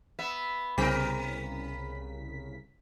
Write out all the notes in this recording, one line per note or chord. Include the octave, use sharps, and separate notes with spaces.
B3 E5
C2 C#3 B3 A#4 B6